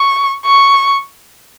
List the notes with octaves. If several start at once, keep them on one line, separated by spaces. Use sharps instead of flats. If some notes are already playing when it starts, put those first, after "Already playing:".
Already playing: C#6
C#6